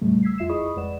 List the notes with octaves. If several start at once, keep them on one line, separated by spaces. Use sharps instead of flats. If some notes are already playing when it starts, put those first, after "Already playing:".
F2 A#2 C#3 G3 A3
E6 G#6 B6 C7
F2 F4 E5 C7 E7
E4 G#4 D#5 B5 C#6 D#6
B5 D#6
F2 G#3 B4 D5 F#5 E7